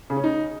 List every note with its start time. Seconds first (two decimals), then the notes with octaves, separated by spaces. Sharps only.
0.10 C#3
0.17 C#4
0.24 D#4